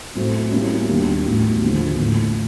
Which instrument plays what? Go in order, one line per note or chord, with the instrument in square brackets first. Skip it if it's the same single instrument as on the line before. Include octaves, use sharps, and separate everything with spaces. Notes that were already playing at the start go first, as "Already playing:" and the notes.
[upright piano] A2 F#3 A3 C4
B2 G3 A#3 C#4 E4
D#2 D#3 G3 A#3 D4
A1 A2 F#3 B3
D#2 D3 F3 A#3
A1 A2 F3 A3